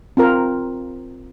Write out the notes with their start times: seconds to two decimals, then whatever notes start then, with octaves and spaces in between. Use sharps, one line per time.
0.17 C4 F4 A#4